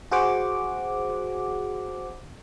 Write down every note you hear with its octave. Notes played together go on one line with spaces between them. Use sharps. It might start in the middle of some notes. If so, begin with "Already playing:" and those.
F#4 G#4 C5 F#5 D6